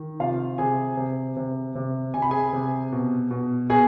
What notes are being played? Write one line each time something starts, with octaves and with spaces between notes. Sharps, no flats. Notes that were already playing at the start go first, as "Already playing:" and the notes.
Already playing: D#3
C3 F4 F5
C3 G#4 G#5
C3
C3
C3
C3 G#5
B5
G#4 G#5
C3
B2
B2
B2 G#4 G#5